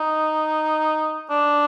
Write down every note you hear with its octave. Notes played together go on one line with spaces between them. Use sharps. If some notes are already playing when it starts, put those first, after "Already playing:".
Already playing: D#4
D4